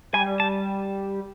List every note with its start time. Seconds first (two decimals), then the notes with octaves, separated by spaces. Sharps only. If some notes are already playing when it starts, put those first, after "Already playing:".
0.13 G3 G#5
0.40 A5